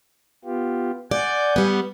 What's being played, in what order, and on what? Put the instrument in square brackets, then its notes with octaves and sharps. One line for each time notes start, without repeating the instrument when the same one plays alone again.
[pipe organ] B3 F4 G4
[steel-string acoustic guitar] D5 [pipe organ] F#5 G#5 G6
[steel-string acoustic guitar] G3 B3